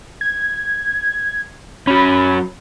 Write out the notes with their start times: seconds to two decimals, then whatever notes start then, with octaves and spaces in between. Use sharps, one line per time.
0.21 G#6
1.87 F#3 C#4 B5